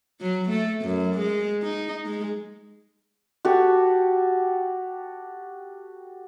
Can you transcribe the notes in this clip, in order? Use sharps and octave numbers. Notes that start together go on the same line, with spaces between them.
F#3
A3
F#2
G#3
D#4
G#3
F#4 G4 A4